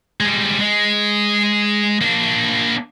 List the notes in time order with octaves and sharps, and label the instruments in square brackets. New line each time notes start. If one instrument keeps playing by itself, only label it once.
[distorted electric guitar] G3 G#3
G#3
A#3 D4